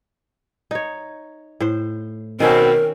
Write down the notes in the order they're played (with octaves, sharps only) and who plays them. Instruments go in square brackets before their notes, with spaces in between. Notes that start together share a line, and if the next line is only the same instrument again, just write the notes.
[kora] D#4 C#5
A2 C5
[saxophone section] B2 C4 [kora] D#3 C#4 G5 [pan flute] A#4